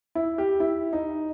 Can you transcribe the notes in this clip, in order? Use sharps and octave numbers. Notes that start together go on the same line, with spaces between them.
E4
G4
E4
D#4